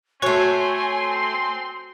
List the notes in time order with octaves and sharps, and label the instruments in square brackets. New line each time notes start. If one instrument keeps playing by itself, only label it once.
[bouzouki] A3 C#5 [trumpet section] C4 C6 [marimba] F#4 [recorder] G#5